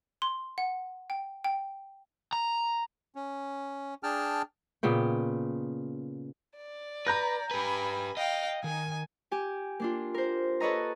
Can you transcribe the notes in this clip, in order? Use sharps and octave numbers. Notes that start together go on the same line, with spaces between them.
C6
F#5
G5
G5
A#5
C#4
D4 G#4 G5 A5 F6
A#2 C#3 B3 G5
D5
B4 A#5 G6 A#6
G4 B4 G#5 B5
D#5 F5 G5
D#3 G#5
G4 G#5
A#3 D4 F4
A#4 C5
A4 B4 C#5 D#5 A#5